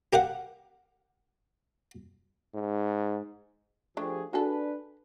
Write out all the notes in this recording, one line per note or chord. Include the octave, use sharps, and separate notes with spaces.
G4 A#4 F5 F#5
G#2
F3 A3 D4 G4 G#4
D4 F#4 G#4 A4 B4